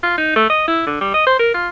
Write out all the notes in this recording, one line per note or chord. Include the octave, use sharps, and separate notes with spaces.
F4
D#4
A3
D#5
E4
D3
G3
D#5
C5
A#4
F4